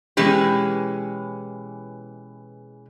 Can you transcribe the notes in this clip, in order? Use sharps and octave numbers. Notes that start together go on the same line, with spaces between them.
B2 E3 G#3 C#4 G4